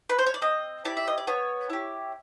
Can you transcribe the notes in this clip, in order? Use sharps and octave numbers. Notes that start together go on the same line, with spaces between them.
B4
C5
C#5
D5
C4 D#5
E4 G4 D5
E5
D#5
D5
B3 C#5
E4 G4